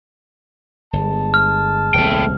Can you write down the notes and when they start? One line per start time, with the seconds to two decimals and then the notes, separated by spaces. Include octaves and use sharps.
0.93 G1 G#3 A5
1.34 F6
1.94 D#1 C2 A3 G5